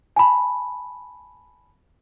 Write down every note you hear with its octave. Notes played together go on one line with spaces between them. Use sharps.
G#5 A5 B5